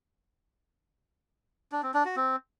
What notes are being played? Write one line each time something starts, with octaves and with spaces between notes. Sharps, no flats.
D4
C4
D4
F#4
C4